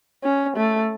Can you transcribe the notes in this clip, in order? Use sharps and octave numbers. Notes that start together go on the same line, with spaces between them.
C#4
A3